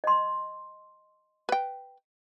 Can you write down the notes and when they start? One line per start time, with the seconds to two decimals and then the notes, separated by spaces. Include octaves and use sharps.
0.04 D#5 C6
1.49 B4 G5